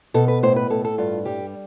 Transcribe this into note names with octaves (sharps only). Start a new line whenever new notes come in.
B2 A4
B4
A2 C5
B4
A2 A4
A4
G2 F4
G3 G4